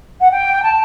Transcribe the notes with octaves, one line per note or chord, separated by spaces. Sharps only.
F#5
G5
A5